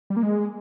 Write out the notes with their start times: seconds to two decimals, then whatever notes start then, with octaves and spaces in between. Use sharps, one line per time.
0.10 G3
0.16 A#3
0.23 G#3